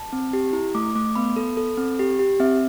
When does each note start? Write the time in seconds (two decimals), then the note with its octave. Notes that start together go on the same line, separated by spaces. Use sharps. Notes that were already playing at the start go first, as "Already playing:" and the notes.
Already playing: A5
0.13 C4
0.33 G4
0.53 E4
0.75 A3 D6
0.95 A3 D6
1.15 B3 B5
1.36 A4
1.57 A4
1.77 C4
1.99 G4
2.19 G4
2.40 C4 E5